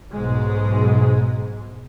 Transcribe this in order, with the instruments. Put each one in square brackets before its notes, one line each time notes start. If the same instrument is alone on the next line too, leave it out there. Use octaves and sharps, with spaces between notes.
[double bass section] B1 G#2 G#3